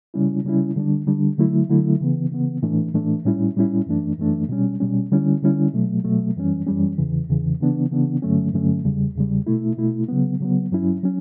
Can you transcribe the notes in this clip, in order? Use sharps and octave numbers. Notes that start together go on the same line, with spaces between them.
C#3 G3 C#4 E4
C#3 G3 C#4 E4
D3 G3 D4
D3 G3 D4
D3 F#3 A3 E4
D3 F#3 A3 E4
C#3 E3 B3
C#3 E3 B3
A2 E3 A3 D4
A2 E3 A3 D4
A2 G3 C#4 E4
A2 G3 C#4 E4
F#2 E3 A3 D4
F#2 E3 A3 D4
B2 G3 C#4
B2 G3 C#4
D3 G3 C#4 E4
D3 G3 C#4 E4
B2 F#3 A3
B2 F#3 A3
F#2 E3 G3 C#4
F#2 E3 G3 C#4
E2 C#3 E3
E2 C#3 E3
C#3 E3 B3 D4
C#3 E3 B3 D4
G2 D3 F#3 A3 C#4
G2 D3 F#3 A3 C#4
E2 C#3 G3
E2 C#3 G3
B2 A3 E4
B2 A3 E4
C#3 F#3 B3
C#3 F#3 B3
G2 F#3 C#4 E4
F#3 C#4